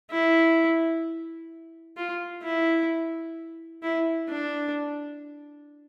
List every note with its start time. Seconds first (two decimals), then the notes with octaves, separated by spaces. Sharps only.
0.11 E4
1.97 F4
2.43 E4
3.83 E4
4.29 D4